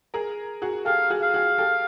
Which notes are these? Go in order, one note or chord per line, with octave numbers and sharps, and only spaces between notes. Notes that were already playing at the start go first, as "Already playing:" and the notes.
G#4 A#4
F#4 G#4
G4 A4 F5
F#4 G#4
F5
F#4 G#4
G4 A4